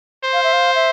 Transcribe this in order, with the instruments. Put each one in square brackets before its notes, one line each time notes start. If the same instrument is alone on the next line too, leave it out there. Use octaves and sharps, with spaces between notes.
[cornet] C5
[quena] F5
E5
F5
E5